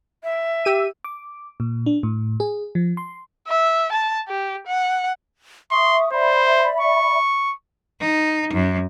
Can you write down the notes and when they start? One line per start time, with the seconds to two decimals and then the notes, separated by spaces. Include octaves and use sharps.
0.23 E5
0.65 G4 E6 D#7
1.04 D6
1.60 A#2
1.86 D4
2.03 A2
2.40 G#4
2.75 F3
2.97 C6
3.48 E5
3.92 A5
4.29 G4
4.67 F#5
5.71 E5 C6 C#6 D#6
6.12 C5 D5 E5 B5
6.80 C#6
8.01 D#4
8.53 F#2